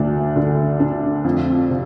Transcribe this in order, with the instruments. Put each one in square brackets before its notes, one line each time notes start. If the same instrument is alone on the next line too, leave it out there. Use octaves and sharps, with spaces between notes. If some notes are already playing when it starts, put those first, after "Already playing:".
Already playing: [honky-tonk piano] D2 D4
D3
D4
F2
C3